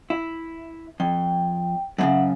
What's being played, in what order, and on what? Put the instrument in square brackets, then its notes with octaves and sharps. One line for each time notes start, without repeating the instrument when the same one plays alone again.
[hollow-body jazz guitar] E4
[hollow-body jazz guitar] F2 [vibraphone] G5
[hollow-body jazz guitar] F#2 A2 C#3 [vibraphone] E5 F#5